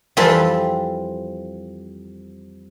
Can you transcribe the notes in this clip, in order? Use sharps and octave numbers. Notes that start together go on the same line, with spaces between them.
F2 E3 G3 C4 F4 A5